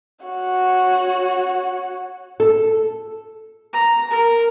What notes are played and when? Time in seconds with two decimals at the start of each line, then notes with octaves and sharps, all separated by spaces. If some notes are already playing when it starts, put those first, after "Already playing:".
0.25 F#4 C#5
2.40 A4
3.73 A#5
4.10 A#4